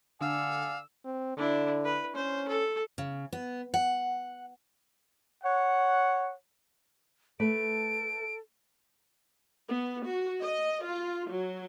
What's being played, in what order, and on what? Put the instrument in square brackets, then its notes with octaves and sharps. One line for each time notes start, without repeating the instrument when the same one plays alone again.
[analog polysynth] D3 [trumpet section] D5 F#5 G#5 [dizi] F5 [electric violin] E6
[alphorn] C4
[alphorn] D3 [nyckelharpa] D4 E4
[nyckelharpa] B4
[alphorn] C#4 [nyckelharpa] C5
[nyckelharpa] A4
[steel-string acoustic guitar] C#3
B3
F#5
[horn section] C#5 F#5
[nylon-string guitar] A3 B4 [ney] A4 [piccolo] D7
[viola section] B3
F#4
D#5
F4
F#3